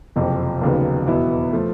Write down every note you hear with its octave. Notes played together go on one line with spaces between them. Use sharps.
F#1 F2 C3 F3
F1 D#2 C#3 F#3 B3
E2 B2 F#3 B3 E4
F3 A3